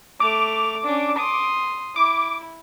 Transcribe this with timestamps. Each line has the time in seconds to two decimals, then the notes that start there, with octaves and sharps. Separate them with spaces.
0.20 A3 D6 F7
0.84 C#4 D4
1.18 C6 D#6
1.96 E4 D6